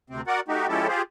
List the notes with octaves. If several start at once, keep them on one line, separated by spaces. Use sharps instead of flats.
D2 C3 C4
F#4 A#4 D5 F#5
A3 D#4 F#4 G4
F3 G#3 C#4 E4 G4 A4
F4 G4 G#4 C5